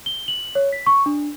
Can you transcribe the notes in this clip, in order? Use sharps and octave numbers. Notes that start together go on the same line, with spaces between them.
G7
F#7
C#5
B6
C#6
D4